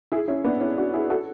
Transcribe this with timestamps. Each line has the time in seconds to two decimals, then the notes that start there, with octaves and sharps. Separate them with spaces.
0.12 E4 G#4
0.28 C#4 E4
0.44 B3 D4
0.61 C#4 E4
0.77 D4 F#4
0.93 E4 G#4
1.10 F#4 A4